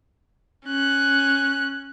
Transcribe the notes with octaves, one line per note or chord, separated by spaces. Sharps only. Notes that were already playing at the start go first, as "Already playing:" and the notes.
C#4 F#6